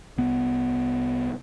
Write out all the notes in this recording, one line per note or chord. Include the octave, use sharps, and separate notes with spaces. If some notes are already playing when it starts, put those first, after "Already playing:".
C2 B3